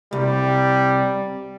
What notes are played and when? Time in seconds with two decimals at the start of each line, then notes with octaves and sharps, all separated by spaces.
0.13 C2 G3